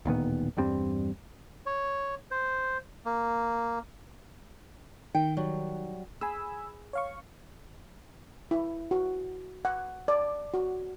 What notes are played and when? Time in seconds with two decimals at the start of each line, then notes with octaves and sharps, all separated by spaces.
0.05 D1 A#2 D#3 B3
0.57 E2 G2 G3 C4
1.66 C#5
2.31 C5
3.05 A#3
5.15 D#3 G5
5.37 F#3 G3
6.21 G#4 G#5 B5 E6
6.93 C#5 F5 C#6
8.51 E4
8.91 F#4
9.65 F#5
10.08 D5
10.54 F#4